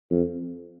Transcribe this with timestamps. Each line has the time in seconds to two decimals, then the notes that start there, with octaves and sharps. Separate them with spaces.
0.11 F2